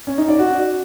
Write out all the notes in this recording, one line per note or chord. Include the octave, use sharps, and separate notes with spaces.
C#4
D#4
D5
F#4